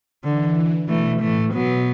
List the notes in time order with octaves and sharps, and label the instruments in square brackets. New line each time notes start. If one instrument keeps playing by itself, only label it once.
[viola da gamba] D3 [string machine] E3
[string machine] B2 [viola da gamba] E3 A3
[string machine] A2 [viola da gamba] E3 A3
[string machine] B2 [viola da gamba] F#3 B3